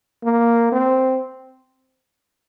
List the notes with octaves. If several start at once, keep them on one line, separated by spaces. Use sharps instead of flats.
A#3
C4